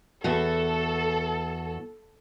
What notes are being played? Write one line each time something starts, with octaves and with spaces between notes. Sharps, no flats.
E2 F#4 A4